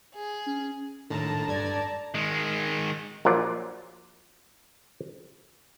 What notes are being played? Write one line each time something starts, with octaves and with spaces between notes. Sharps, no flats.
G#4
C#4
A2 D3 D#3 A5 A#5
G2 D5 G#6
D#3 G#3
A#1 A#2 F#3 F4 D5